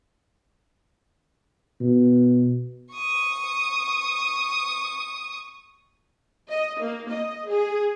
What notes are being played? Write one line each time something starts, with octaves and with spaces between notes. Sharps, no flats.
B2
C#6 D#6
D#5
A#3
D#5
G#4